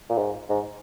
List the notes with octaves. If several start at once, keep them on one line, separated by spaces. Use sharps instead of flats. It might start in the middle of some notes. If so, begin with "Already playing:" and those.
A#2
G#2
G#2